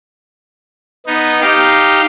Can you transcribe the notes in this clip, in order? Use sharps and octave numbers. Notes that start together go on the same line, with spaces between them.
B3 D#4
D#4 G4 F5